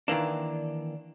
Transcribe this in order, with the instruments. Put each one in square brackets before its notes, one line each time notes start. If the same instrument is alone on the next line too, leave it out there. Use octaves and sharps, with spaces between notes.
[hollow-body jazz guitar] D#3 E3 A#3 D4